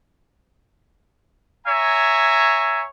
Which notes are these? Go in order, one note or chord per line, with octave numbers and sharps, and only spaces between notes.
C#5 E5 G#5 A#5